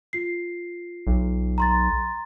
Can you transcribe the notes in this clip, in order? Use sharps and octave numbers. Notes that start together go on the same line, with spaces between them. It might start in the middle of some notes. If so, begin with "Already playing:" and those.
F4 C7
B1
A#5 C6 A6